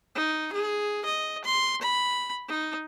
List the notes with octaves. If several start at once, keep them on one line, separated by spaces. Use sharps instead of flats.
D#4
G#4
D#5
C6
B5
D#4